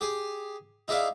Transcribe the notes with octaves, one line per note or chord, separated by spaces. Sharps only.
G4 G#4 G#5
D#4 E4 G#4 D5 E5 F5